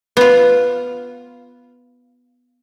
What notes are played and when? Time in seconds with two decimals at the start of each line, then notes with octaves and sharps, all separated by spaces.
0.17 B3 F4